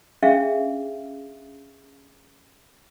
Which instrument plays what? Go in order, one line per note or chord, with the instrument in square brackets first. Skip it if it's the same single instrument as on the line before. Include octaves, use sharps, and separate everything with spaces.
[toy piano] C#4 D4 G#4 E5 F5